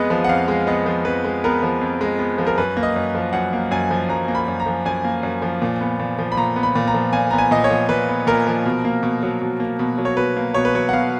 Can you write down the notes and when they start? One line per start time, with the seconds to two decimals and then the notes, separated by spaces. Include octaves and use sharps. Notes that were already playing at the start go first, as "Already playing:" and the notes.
Already playing: F2 G#3 B3 B4 D#5
0.10 F3
0.24 F#5
0.29 F2 F5
0.48 G#3
0.67 B3 D#5
0.86 F3
1.05 F2 B4
1.24 G#3
1.44 B3 A#4
1.63 F3
1.81 F2
2.01 G#3
2.19 B3
2.38 F3
2.47 A#4
2.58 F#2 B4
2.77 A#3
2.83 D#5
2.96 F#2
3.15 F3
3.33 F#2 F#5
3.53 A#3
3.71 F#2 G#5
3.90 F3
4.09 F#2 A#5
4.28 A#3
4.35 B5
4.48 F#2
4.60 A#5
4.66 F3
4.85 F#2 G#5
5.05 A#3
5.23 F#2
5.42 F3
5.62 A#2
5.81 B3
5.99 A#2
6.18 F3
6.32 B5
6.37 A#2 A#5
6.56 B3
6.63 B5
6.75 A#2
6.88 A#5
6.94 F3
7.13 A#2 G#5
7.31 B3 A#5
7.38 G#5
7.51 A#2 D#5
7.64 C#5
7.70 F3
7.89 A#2 B4
8.09 B3
8.27 A#2 A#4
8.47 F3
8.66 B2
8.85 A#3
9.03 B2
9.23 F#3
9.42 B2
9.60 A#3
9.79 B2
9.98 F#3
10.05 C#5
10.17 B2 B4
10.37 A#3
10.54 B2 C#5
10.65 B4
10.74 F#3 C#5
10.89 F#5
10.93 B2 F5